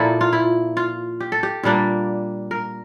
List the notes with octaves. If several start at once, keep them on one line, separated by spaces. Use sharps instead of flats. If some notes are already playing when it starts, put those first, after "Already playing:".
Already playing: A#2 F3 A#3 E4 A4
F4
E4
F4
G4
A4
G4
A#2 G3 A#3 D4
A#4